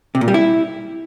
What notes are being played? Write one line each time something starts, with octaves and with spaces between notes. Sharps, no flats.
C3
A#2
G3
E4